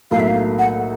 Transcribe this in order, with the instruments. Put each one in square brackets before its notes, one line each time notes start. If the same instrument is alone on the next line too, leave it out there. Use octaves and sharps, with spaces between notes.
[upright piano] B1 A2 F#3 A#3 [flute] F5
[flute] E5
F5
F#5